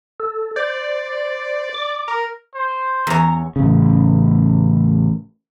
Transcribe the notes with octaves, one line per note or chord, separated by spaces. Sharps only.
A4
C5 D5
D6
A#4
C5
E2 C#5 A#5
A1 C#3